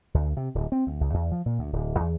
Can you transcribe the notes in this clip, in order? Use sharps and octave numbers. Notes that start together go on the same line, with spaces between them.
D2
C3
D1
C4
D2
C#2
E2
F3
A#2
D2
D1
E2